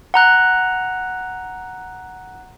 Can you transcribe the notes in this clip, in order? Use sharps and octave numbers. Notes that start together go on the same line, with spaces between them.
F#5 A#5 F#6